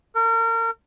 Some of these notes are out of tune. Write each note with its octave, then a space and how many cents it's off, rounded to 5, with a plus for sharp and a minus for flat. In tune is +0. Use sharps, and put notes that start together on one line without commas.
A#4 -35